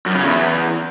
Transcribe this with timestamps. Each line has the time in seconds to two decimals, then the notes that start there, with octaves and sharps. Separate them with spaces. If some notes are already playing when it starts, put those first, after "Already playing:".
0.06 F#2
0.15 C#3
0.23 E2